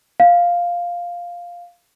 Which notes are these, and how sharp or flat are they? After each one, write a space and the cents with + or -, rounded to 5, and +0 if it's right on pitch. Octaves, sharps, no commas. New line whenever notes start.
F5 +0